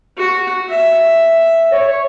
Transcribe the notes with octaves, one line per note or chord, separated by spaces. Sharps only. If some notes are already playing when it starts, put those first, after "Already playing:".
F#4
E5
C#5